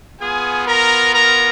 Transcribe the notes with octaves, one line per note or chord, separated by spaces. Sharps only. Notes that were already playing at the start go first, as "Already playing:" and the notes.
B3 F4 G#4 G#5
A#4 A#5
A#4 A#5